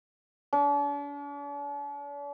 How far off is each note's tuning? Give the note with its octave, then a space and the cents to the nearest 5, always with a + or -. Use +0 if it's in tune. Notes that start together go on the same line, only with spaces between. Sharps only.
D4 -45